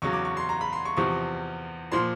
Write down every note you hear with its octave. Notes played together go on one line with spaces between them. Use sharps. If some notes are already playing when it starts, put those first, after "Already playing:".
E2 C#3 F#3 C#6
D6
C#6
C6
A#5
B5
C6
C#6
E2 C3 F3 C#6
A#2 F3 C6